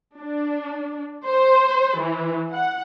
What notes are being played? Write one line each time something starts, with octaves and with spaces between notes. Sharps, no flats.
D4
C5
E3
F#5